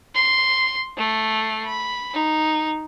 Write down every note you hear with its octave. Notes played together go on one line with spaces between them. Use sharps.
C6
A3 C7
B5
D#4